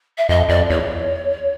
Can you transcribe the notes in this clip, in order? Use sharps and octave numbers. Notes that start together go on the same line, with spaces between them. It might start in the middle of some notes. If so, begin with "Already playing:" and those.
E5
F2 D#5
F2 D5
E2 C#5